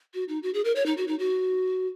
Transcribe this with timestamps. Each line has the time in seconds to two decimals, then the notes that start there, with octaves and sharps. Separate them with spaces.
0.14 F#4
0.29 D#4
0.43 F#4
0.54 G#4
0.65 A#4
0.76 C#5
0.86 D#4
0.97 F#4
1.08 D#4
1.19 F#4